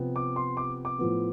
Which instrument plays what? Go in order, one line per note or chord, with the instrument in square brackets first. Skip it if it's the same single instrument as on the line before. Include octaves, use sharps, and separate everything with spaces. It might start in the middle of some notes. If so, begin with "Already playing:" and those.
Already playing: [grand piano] C3 F3 B3
D6
C6
D6
D6
A2 F3 B3